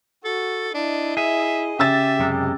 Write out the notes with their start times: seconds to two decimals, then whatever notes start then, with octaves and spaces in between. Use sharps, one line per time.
0.25 F#4 A4
0.74 D4 E4 D#5
1.17 G#4 E5
1.79 C#3 G4 E5 E6 A6
2.19 F#2 C3 G#3